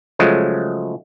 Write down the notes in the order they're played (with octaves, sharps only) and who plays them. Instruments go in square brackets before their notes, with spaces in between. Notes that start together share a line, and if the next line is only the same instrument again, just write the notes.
[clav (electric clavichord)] C#3 F3 F#3 G#3 A3